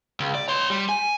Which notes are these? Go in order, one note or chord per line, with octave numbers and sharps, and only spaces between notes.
C#2
D5
C#5 C6
G3
G#5